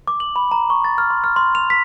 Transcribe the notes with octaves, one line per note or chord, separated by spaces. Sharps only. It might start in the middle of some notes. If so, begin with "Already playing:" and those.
D6
F#7
B5
A#5
C#6
A6
F6
C6
F6
C6
F7
B6